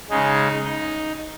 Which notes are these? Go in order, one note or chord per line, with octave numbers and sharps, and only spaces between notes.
C#3 G#3 D#4
D#4